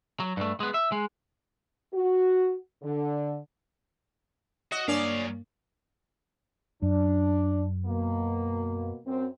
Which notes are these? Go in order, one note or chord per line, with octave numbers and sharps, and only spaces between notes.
F#3
G2 A3
G#3 B3
E5
G#3
F#4
D3
F#4 D#5
G2 F#3 A#3 C#4 D4 D5 F5
F#2 D4
B2 A#3
F#2 C4